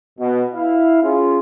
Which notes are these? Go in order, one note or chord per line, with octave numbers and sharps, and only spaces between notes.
B2
E4 F5
C#4 F4 G#4